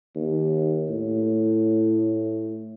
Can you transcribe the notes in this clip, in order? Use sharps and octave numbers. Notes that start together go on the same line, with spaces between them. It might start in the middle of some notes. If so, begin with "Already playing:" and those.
D#2
A2